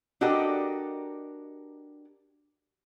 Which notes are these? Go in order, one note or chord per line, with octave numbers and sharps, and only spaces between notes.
D4 F#4 G4 A4 A#4 D#5